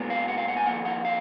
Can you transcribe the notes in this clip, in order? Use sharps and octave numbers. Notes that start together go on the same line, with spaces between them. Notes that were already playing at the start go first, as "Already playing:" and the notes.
Already playing: A#2 G#3 B3
F5
F#5
F5
F#5
G#5
F2 D#3 A#3 F#5
F#5
F5